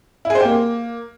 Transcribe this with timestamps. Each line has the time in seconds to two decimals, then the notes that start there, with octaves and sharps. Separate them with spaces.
0.25 E4
0.30 G#4
0.35 C5
0.40 G4
0.45 A#3